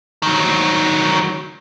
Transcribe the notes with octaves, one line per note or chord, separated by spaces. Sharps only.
D#3 F#3